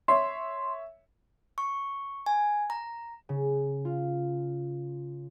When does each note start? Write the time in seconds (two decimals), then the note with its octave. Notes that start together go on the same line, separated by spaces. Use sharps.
0.08 C#5 E5 C6
1.58 C#6
2.26 G#5
2.70 A#5
3.29 C#3
3.85 F4